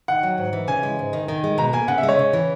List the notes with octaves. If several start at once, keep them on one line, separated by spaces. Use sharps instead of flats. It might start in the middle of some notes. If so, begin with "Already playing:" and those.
D#3 F#5
F#3
G#2
E3
C#3 G#5
G#3
G#2
D#3
D#3
G#3
B2 A#5
A#3 G#5
C#3 F#5
E5
G#3
C#5
C#3
E3